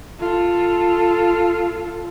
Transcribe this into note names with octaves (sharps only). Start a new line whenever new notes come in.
F4 A4